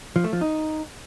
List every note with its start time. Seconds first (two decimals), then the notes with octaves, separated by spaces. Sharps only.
0.16 F3
0.24 A3
0.33 F3
0.41 D#4